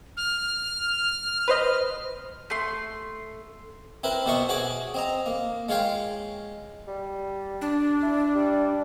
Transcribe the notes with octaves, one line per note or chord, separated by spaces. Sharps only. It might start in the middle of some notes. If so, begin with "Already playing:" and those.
F6
B4 C5 D#5
A3 C6
C4 E4 A#4 B4
B2 G4 C5 E5 C#6 D#6
F#4 G#4 C#5 G#5 D6
C4 D#5 A#5
A#3
G#3 F4 C#5 F5 G5
G3
D4
E4
G3